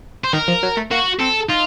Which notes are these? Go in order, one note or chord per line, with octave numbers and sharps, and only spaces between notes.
C5
D#3 A#4
F3
F#3
A3
A#3 F#4
C4 A4
D#4 F4